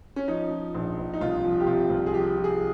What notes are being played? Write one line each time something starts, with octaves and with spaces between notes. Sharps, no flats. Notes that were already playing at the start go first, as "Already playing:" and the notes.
C#4
F3 D#4
F3
A#1
A#1
D#4
C2 F4
F3
G4
C3 F4
C2
G#4
F3 G4
F3
G#4